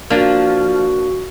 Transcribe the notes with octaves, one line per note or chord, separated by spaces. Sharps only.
F3 A#3 D4 F#4